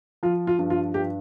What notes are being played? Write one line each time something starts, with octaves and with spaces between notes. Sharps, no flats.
F3 F4
F4
G2
F4
G2 G4